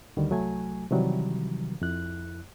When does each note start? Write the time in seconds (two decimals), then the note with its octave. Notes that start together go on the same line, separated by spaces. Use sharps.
0.17 D2 D3 D#3 G3
0.30 C2 F#3 A3 G#5
0.91 C3 D#3 E3 F#3 G3
1.81 F2 E4 F#6